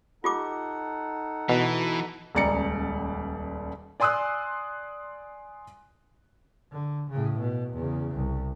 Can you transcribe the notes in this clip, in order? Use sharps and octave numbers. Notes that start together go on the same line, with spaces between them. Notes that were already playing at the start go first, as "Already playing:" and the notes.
D#4 F4 G4 A4 F#5 D6
B2 E3
D#1 C#2 D5 A#5 C#7
D5 G#5 C6 D#6 E6 F#6
D3
A2 C#3
B2
E2 C#3
C2